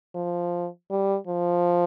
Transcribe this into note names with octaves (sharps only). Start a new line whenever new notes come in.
F3
G3
F3